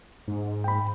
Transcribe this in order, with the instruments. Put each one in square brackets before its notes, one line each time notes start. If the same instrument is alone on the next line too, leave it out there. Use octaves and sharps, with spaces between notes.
[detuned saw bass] G#2
[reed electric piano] G5 B5